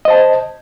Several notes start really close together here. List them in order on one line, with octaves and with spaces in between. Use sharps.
D#5 C5 A5